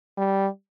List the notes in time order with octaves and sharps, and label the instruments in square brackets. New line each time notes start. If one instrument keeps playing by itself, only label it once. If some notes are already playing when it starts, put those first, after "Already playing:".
[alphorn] G3